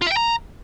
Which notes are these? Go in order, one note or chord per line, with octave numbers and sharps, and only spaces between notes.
F4
E5
G5
A#5